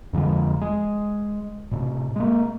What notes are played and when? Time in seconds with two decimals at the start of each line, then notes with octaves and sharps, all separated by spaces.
0.13 F2 D3 F3 G#3
0.61 G#3
1.71 A2 C3
2.16 G#3 A#3